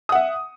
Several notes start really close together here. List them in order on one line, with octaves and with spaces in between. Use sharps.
D#6 F#5 E5